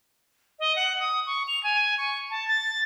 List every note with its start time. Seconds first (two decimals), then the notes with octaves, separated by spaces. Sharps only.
0.60 D#5
0.76 F#5
1.00 D#6
1.27 C#6
1.48 F7
1.64 G#5
1.98 C#6
2.30 A5
2.48 A6